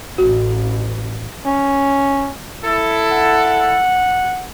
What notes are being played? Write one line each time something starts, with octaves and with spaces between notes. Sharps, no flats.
A1 F#4
C#4
E4 A4
F#5